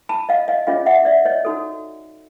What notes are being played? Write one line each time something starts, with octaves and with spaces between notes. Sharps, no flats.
A5 B5
D#5 F5
D#5 F5
C#4 F4 G#4 C#5 D#5 F5
E5 F#5
D5 E5
C#5 D#5
D#4 F#4 A4